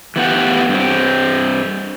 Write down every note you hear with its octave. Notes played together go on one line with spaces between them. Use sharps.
E3 A3 B3 F4 G4 F#5
G2 C4